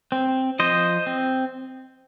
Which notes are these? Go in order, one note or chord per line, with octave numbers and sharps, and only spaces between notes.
C4
F3 C5 D#5
C4